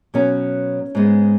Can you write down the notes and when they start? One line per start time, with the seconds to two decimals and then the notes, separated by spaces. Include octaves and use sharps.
0.14 B2 F#3 B3 C#4
0.95 G#2 G#3 B3